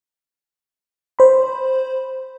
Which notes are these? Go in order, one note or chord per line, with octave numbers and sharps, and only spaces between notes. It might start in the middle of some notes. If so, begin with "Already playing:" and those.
C5 B5